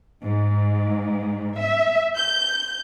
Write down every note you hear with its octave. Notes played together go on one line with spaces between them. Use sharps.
G#2
E5
G6